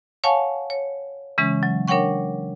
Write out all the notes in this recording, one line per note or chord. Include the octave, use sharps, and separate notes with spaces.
C#5 F5 F#5 G#5 A5 C#6
C#5
C#3 E3 G#3 C#4
F#3
D4 A#4 C#5 F#5 G5 C#6